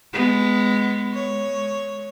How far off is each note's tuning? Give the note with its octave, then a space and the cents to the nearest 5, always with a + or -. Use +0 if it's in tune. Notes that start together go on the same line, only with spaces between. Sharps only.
G#3 +0 B3 +15
G#3 +25 C#5 +0